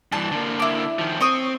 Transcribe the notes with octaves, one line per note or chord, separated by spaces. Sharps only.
G2 E3 A5
D3 A#3
E4 D6
D#3 F3
C4 C#5 C#6 D#6